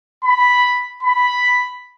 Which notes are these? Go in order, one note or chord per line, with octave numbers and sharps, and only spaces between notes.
B5
B5